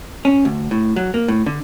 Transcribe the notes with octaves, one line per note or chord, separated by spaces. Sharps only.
C#4
D2
A2
F#3
A#3
A2
D3